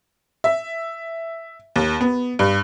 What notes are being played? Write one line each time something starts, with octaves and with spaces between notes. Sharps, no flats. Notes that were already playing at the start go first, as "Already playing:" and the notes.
E5
D#2
B3
G2